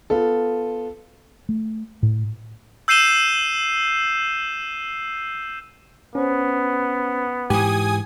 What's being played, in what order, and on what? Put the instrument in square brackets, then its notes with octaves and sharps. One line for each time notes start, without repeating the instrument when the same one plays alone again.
[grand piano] B3 F4 A4
[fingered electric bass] A3
A2
[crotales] E6 G6 C7 D#7 E7 G7
[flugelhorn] B3 [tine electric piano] C#4 C5
[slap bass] G#2 E3 [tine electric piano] G4 [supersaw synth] G#5 D#6